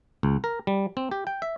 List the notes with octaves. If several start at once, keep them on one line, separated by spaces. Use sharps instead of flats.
C#2
A#4
G3
C4
G4
G5
E5